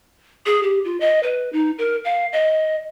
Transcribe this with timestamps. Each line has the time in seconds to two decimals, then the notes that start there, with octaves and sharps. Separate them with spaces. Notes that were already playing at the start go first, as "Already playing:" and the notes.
0.46 G#4
0.63 G4
0.85 F4
1.00 D#5
1.23 B4
1.53 D#4
1.78 A#4
2.05 F5
2.33 D#5